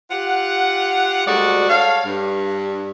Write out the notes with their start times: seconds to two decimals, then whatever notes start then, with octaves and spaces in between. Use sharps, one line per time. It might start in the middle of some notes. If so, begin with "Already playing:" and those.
0.10 F4 G4 F#5
1.27 D2 G3 G#3 F#4 D5
1.70 A4 C#5 F5
2.06 G2